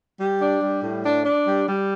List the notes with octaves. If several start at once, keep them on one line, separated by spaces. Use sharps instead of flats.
G3
D4
G3
A2
D4
D4
G3
G3